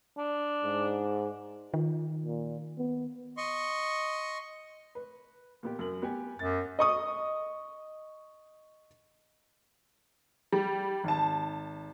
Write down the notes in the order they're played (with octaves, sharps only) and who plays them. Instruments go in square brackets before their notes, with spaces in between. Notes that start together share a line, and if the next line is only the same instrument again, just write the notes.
[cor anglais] D4
[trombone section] G#2
[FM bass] D#3 [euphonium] F4
[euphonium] A#2
B3
[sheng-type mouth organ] D#5 C6 C#6
[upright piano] B4
A#2 B3 G4
F#2 A#4 F#7
B3 G4 G#5
[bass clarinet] F#2 [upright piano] A6
[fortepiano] D#5 C#6 D#6
[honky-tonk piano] G3
G#1 A5